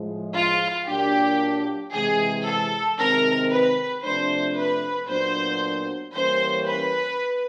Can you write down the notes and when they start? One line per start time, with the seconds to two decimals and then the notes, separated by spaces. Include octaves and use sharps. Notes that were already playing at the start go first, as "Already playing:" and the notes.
Already playing: A2 F3 G#3
0.35 F4
0.87 A#2 F#3 A#3 D4 G4
1.93 C3 E3 G#3 G#4
2.46 A4
2.99 C3 D#3 G#3 C4 A#4
3.51 B4
4.03 C3 F3 A3 D4 C5
4.57 B4
5.09 A#2 F#3 B3 D4 C5
6.15 E3 G3 A#3 C#4 C5
6.67 B4